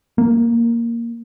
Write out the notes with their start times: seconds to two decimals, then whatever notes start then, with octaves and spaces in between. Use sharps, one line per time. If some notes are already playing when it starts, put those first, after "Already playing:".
0.18 A#3